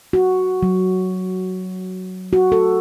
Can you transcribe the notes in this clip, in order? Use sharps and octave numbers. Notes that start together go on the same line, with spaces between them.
F#4
F#3
F#4
A4